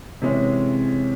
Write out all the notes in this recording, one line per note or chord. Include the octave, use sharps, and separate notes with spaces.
C3 E3 G#3 C#4 G#4